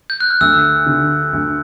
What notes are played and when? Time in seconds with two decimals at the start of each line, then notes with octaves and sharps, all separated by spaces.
0.10 G6
0.20 F#6
0.30 F6
0.41 D2 E6
0.86 D3
1.33 D2